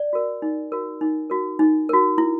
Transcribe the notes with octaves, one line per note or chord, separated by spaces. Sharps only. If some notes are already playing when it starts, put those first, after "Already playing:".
Already playing: D5
F#4 A#4
D#4
F#4 A#4
D#4
F#4 A#4
D#4
F#4 A#4
E4